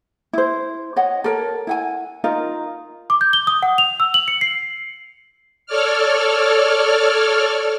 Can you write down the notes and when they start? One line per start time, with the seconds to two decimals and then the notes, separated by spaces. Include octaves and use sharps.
0.33 E4 C5
0.96 C#5 D#5 F#5
1.24 A4 A#4 C#5
1.67 E4 F#5 G#5
2.24 D#4 F4 A#4
3.10 D6
3.21 G6
3.33 G7
3.47 D#6
3.63 F#5
3.78 F7
4.00 E6
4.14 F#7
4.28 C#7
4.41 C7
5.66 A4 C#5 D5 F6